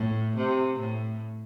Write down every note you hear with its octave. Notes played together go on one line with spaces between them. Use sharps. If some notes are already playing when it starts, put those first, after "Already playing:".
Already playing: A2
C3
A2